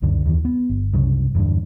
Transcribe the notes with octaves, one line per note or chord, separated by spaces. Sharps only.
C#2 F#2 D3
D#2 E3
B3
G1
C2 F#2 C#3
E2 G2 D3